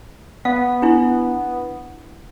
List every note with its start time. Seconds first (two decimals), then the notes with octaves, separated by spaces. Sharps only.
0.45 B3 F5
0.82 D4 E4